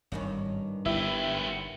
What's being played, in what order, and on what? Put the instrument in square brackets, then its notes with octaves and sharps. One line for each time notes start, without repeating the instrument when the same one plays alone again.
[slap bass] G#1 [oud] G2 D#3 C#4
[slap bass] G1 [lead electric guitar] B3 G4 [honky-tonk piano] E4